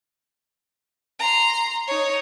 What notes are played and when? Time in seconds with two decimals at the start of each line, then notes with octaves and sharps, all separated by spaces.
1.19 A#5 C6
1.88 D#4 C#5